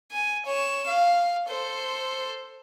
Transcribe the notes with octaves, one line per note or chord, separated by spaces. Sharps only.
G#5
C#5 E7
F5
A4 C5